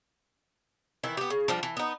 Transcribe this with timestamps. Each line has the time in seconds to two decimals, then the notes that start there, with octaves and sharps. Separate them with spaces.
1.04 D#3 E3 E4
1.17 B3 G4
1.30 C#3
1.48 F3 G3 D4
1.63 E3
1.77 B3 D#4